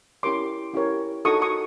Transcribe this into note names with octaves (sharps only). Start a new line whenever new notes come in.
C#4 E4 G4 A#4 C#5 C6 D6
C#4 E4 G4 A#4 C#5
D#4 F#4 A4 C#6 D#6
C#6 D#6